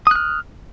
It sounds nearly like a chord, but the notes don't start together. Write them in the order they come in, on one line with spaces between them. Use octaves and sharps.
D#6 F#6 F6